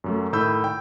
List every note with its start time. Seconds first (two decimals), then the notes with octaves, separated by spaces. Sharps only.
0.04 F#2 F#3 A3
0.33 A2 D#3 B5 E6 G6
0.64 G5